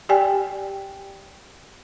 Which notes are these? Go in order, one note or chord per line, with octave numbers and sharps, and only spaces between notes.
G4 D5 G5 G#5